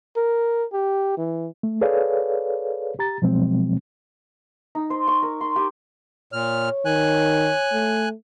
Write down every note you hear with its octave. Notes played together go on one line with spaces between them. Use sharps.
A#4
G4
E3
A3
G#4 A4 B4 C#5 D5 F5
G4 A#5 A6
B2 F3 F#3 G#3 C4
D#4
C5
C#6
A#4
C6
G4
A#2 C#5 F6
D#3 G#5 F#6
A3